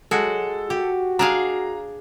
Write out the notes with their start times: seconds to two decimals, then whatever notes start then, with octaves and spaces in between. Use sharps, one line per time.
0.11 F#3 G#3 F#4 A4
0.70 F#4 G4
1.19 D4 G#4 F5 A#5